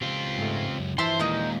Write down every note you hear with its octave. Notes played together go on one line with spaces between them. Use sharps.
C#2 C4 F4 G4
G#2 A3
F#2
G2 E3 F3 C5 E5 A5 C6
D#2 A#2 G#3 D#4 A#4 D#5